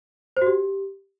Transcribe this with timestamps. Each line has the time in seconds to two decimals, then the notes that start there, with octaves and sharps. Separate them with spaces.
0.37 C5
0.42 F#4
0.47 G4